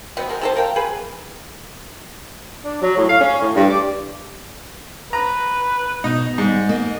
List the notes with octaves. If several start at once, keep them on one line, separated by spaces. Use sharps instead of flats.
B2 B3 C4
G#3 A#4
C3 A4 C5
A#4 F5 G5
G#4 B4
D4
F#3
A2
F5
C#4
A2
G2
D5
B4 A#5
B2 D#4
G#2 G3 B3
A#3 D#5